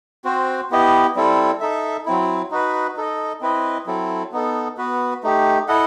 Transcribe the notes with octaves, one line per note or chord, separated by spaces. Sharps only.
C4 F#4 C5
B3 E4 G4 D#5
G3 C4 E4 A4
D#4 A4 E5
F#3 C4 E4
D#4 F#4 B4
D#4 A4 D#5
C4 E4 B4 D#5
F#3 C4 E4 A4
B3 D#4 A4
B3 F#4 B4
A3 D#4 G4
E4 A4 D#5 F#5